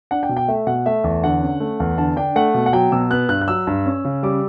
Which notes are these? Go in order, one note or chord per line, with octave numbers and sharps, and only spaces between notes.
D4 F#5
G5
B2
G5
A3 E5
B2 F#5
A3 E5
E2
D3 F#5
C#4
A3
E2
D3 A5
D4 G5
A3 F#5
B2
F#5
F#3 G5
B2 E6
B3 F#6
G2 F#6
F#6
F#3 E6
G2
C#4
C#3
G3 D6